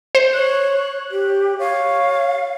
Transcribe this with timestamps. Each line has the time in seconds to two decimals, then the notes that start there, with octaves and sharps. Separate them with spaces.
0.15 C5
0.33 C#5 F#6
1.11 G4
1.59 C#5 F5